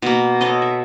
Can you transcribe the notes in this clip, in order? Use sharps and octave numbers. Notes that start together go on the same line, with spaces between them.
B2 A#3
A4 B4 C#5 D#5
E5